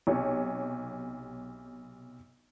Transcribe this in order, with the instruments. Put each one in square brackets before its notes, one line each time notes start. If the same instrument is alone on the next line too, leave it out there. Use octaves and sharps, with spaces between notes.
[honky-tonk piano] B1 C3 G4 C#5